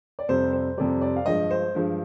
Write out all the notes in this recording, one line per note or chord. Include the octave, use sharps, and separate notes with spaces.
D5
F2 C3 G3 C5
C5
F2 C3 G3 D5
D5
F5
G2 F3 G#3 D#5
C5
G2 F3 G#3